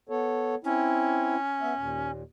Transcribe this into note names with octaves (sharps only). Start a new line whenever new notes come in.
B3 A4 C#5
C4 C#4 E4
B3 E5
D#2 A#2